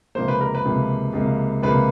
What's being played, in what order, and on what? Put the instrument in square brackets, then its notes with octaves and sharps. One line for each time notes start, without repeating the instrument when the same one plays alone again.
[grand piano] C#2 C3 F3 A#3 C5
B4
A#4
B4
C#2 C3 F3 A#3
C#2 C3 F3 A#3
C#2 C3 F3 A#3 B4